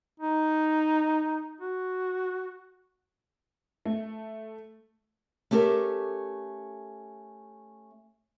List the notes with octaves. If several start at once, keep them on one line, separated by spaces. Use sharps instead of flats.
D#4
F#4
A3
A3 C#4 G4 A4 A#4